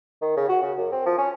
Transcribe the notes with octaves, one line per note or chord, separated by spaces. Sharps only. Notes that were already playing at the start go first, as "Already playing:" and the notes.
D#3
C#3
F#4
C#3
F#2
C4
F3
C#4